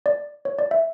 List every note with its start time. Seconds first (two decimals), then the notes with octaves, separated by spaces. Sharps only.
0.06 D5
0.45 C#5
0.59 D5
0.71 E5